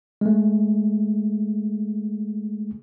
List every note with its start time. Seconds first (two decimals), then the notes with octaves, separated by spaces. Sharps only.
0.21 G#3 A3